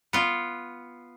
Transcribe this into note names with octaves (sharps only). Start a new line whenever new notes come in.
B3 F4